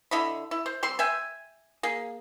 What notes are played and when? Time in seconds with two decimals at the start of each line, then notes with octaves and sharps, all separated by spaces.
0.11 D3 E4 D#5 B5
0.51 E4
0.66 C5
0.83 G3 C4 C6
0.99 E5 G5 G#5
1.83 A#3 G#4